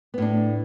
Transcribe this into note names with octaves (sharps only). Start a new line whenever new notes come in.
A2 B3 D4